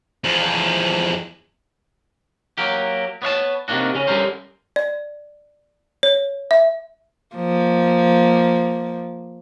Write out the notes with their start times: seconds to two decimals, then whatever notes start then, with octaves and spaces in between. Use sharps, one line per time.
0.24 E2 F3
2.58 F#3 A#3 G4
3.22 B3 C#5 F5 A5
3.68 C3 D#3 F3 A#3 D4 F#4
3.95 C#3 C#4
4.07 D3 G3 C#4 A4 A#4 C5
4.76 D5
6.03 C#5
6.51 E5
7.36 F3 A#3